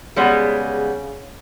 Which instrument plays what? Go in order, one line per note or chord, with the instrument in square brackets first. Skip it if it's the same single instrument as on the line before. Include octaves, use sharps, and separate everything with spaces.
[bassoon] C#3 [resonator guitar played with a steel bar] G3 G#3 B3